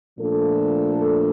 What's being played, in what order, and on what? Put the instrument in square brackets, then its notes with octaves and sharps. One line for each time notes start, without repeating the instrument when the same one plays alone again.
[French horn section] A#2 F3 A3 D4 A4